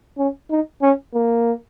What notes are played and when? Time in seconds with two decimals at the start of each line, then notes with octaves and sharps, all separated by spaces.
0.18 C#4
0.50 D#4
0.82 C#4
1.14 A#3